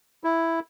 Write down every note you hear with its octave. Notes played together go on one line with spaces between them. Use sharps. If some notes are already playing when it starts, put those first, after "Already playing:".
E4